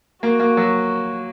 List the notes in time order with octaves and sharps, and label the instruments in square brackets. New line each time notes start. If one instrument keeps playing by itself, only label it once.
[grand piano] A#3 [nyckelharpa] F#4
[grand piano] A#3
F#3